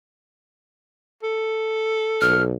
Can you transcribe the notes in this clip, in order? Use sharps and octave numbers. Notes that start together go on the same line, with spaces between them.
A4
B1 F6